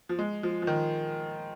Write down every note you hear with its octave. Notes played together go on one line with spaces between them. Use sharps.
F3
G#3
F3
F3
D#3